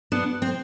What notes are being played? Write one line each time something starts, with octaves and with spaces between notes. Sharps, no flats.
B3 D4
C4